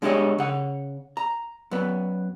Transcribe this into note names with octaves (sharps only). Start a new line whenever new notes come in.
B2 G#3 D4 G4 C#5 D#5
C#3 F#5
A#5
F#2 B3